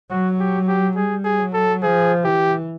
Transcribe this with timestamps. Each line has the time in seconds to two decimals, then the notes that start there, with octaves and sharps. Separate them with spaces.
0.10 F#3 F#4
0.40 G4
0.68 G4
0.96 G3 G#4
1.24 G#4
1.39 F#3
1.54 A4
1.82 F3 G#4
2.24 E3 G4